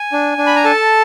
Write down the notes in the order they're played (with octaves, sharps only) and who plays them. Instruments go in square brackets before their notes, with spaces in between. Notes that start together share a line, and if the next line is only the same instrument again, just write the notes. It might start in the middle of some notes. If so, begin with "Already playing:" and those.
Already playing: [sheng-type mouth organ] G#5
D4
D4
B5
A#5
A4 A5